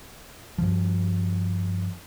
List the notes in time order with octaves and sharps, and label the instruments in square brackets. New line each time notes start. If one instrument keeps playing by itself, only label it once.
[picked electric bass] G2 F3